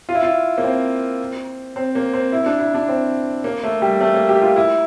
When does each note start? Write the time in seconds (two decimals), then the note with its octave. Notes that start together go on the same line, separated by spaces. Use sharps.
0.09 F4
0.15 E4
0.23 F4
0.58 A#3
0.63 C4
1.76 C4
1.95 A#3
2.13 C4
2.32 E4
2.46 D4
2.60 E4
2.74 D4
2.88 C4
3.44 A#3
3.63 A3
3.82 G3
4.01 A3
4.14 A#3
4.29 G4
4.42 F4
4.56 E4